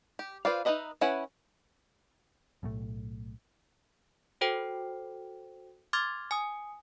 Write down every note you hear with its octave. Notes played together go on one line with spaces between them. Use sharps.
G4
F4 B4 C5 D5 F5
D#4 F4 B4 D#5 E5
C#4 E4 B4 F#5 G#5
B1 A2 A3
F#4 A4 C5 G5
C6 D6 F6 G#6 A6
G#5 D#6